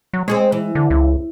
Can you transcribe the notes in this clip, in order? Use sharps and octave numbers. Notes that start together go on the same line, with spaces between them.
F#3
G#3 C4 G#4 C#5
E3
D3
C#2